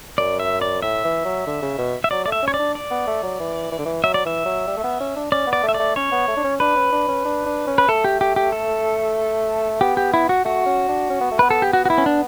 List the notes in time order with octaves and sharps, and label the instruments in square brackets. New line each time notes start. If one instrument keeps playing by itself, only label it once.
[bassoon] F#2 [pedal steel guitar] D5
[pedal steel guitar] E5
D5
[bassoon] A2 [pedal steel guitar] E5
[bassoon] E3
F#3
D3
C#3
B2
[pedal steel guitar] E5
[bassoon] F#3 [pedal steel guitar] D5
[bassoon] A3 [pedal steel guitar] D5
[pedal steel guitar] E5
[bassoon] C#4
[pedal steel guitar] C#5
D5
[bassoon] D4
[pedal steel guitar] D5
[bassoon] B3
A3
F#3
E3
E3
D3
E3
[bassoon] F#3 [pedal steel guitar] E5
[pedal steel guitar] D5
[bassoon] E3 [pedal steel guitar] E5
[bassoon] F#3
G3
A3
B3
C#4
D4
[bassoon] C#4 [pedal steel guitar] D5
[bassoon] B3
[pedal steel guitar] D5
[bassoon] A3
[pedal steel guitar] E5
[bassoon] A3 [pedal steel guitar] D5
[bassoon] C#4 [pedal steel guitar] C#5
[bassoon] B3
A3
D4
C#4
[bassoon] D4 [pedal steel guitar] B4
[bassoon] C#4
D4
C#4
D4
D4
C#4
[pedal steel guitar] B4
[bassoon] A3 [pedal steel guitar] A4
[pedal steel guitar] G4
G4
G4
A4
[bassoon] B3 [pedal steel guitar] G4
[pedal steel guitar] G4
E4
F#4
[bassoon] A3 [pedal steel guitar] F#4
[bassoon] C#4
D4
C#4
B3
A3
[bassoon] B3 [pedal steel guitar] B4
[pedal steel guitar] A4
G4
F#4
F#4
E4
C#4
D4